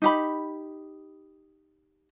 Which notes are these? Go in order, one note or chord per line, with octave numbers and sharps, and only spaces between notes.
D#4 G4 B5